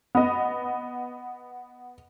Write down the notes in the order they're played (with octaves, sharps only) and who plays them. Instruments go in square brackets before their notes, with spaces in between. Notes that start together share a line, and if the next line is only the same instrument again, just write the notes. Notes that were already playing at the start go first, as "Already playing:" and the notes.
[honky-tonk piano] B3 D#5